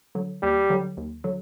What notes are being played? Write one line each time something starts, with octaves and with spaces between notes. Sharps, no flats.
D3 F#3
D#2 G3
D3 F#3
D#2
D3 F#3